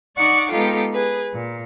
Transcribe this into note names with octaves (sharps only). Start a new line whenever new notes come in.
D#4 D5 F#5 C#6 D6
G#3 B3 D#4 F4 G4 A4
G#4 B4
A#2